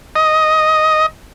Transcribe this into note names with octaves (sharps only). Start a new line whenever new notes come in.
D#5